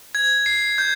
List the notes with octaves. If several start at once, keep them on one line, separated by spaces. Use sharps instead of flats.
G#6
C7
G6